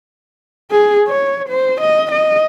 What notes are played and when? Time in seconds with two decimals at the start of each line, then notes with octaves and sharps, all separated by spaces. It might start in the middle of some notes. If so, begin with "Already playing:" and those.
0.71 G#4
1.08 C#5
1.49 C5
1.81 D#5
2.12 D#5